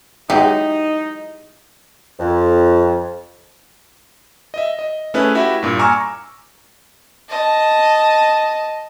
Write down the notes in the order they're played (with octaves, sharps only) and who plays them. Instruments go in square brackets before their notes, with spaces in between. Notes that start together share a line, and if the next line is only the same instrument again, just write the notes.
[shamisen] E3 F#3 G#3 [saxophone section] D#4 [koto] G4
[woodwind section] F2
[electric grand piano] D#5 E5
D#5
A3 C#4 E4 G#4 B4
E4 F#4 G4 E5
G2 A#2
G#5 A#5 C#6 D6 E6 F6
[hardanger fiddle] D#5 A5